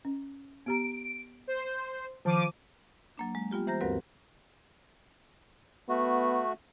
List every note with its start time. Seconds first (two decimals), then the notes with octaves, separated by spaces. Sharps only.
0.05 C#4
0.66 B3 G4 A#5 D7
1.47 C5
2.25 D#3 F3 A5 D6 D#7
3.18 F#3 A#3 D4
3.35 G#3
3.51 G3 B3 F4 G4
3.67 E3 C5 A#5 G6 A#6
3.81 D2 G2 C4 F#4 A#4 B4
5.89 A3 B3 F#4